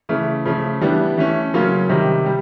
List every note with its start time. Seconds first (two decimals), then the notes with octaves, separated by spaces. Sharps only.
0.09 C#3 E3 A3
0.45 C#3 F3 A3
0.81 E3 G3 B3 D4
1.18 E3 A3 C#4
1.54 C#3 F#3 A#3 C#4 F4
1.89 C3 D#3 G3
2.26 G3